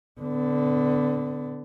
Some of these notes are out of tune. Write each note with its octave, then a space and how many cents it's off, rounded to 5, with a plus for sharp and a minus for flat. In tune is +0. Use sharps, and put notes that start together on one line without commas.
D3 -5 B3 +30